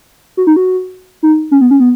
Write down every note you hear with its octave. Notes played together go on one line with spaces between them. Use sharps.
F#4
D#4
F#4
D#4
C#4
B3
C#4
B3